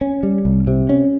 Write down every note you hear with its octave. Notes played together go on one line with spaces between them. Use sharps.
C#4
G3
C2
C3
C#4